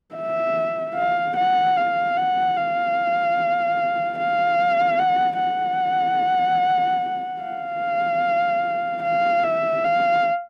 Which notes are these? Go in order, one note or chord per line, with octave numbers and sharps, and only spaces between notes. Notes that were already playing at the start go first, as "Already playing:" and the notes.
E5
F5
F#5
F5
F#5
F5
F5
F#5
F#5
F5
F5
E5
F5